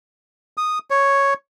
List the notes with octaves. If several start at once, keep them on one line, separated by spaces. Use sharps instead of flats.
D#6
C#5